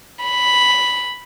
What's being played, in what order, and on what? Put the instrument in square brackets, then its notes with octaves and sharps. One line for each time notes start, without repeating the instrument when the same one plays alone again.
[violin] B5